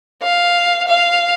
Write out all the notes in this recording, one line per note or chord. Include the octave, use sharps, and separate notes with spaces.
F5
F5